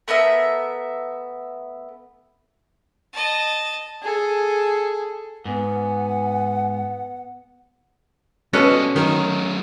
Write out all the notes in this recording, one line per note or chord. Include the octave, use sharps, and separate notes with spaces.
A3 B3 A#4 E5
D#5 A5
G#4 A4
G#2 B3 F#5 G#5
B2 G3 C#4 A4 B4 D#5
D#3 F#3 A3